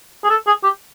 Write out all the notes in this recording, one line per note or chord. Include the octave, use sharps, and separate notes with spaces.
G#4
A4
G#4
G4